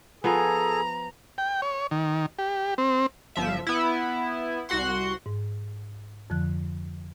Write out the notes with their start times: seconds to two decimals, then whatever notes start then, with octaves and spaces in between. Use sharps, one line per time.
0.24 F3 B3 G#4 A4 G#5 A#5
1.38 G5
1.62 C#5
1.91 D#3
2.39 G4
2.78 C4
3.36 G1 F3 E5
3.67 B3 E4
4.69 C2 F#4 F#5 C6
5.26 G#2
6.30 F2 D3 F3 F#6